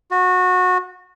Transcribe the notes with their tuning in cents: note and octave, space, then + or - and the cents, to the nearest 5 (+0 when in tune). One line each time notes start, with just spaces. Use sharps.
F#4 -20